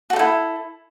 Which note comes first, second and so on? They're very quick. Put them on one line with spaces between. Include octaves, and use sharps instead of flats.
F#4 A4 D#4 E4